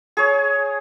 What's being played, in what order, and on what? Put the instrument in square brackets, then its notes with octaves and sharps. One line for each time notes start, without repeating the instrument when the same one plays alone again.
[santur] G#4 C#5